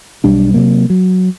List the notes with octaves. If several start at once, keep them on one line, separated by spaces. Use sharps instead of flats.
B1 G3 D4
C3 F#3 A#3
F#3